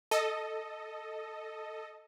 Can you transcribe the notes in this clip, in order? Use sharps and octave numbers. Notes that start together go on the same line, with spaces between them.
A4 D#5